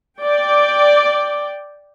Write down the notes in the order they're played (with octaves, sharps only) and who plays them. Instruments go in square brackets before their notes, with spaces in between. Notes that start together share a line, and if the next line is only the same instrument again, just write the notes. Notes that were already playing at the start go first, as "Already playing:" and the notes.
[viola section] D5 G5